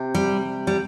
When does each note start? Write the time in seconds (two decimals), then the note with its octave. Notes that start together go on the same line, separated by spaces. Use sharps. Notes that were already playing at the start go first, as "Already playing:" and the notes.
Already playing: C3
0.15 G3
0.67 G3